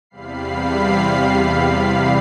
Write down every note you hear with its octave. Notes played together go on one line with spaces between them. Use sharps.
E2 C3 G3 F5 B5 C7